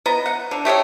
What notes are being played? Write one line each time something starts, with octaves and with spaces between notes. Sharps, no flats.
B3 D#5 A#5
F#5
D3
A3 G4 C#5 D#5